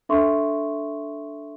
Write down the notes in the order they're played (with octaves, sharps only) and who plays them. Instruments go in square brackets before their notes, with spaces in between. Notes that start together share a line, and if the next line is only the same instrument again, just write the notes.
[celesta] D4 A4 E5 C6 C#6